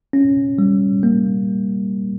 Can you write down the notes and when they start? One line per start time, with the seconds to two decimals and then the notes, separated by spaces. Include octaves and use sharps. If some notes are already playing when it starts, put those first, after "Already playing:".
0.13 C#4
0.58 G3
1.03 A#3